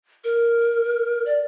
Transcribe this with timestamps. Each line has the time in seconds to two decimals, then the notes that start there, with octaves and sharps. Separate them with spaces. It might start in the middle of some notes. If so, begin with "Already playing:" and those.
0.24 A#4
1.26 D5